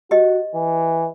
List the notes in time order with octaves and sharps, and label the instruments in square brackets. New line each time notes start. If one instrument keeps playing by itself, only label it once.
[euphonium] F#4 [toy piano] G4 D#5
[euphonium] E3